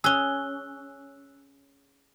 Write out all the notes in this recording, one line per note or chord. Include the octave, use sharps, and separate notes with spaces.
C#4 G#4 E6 F#6 G7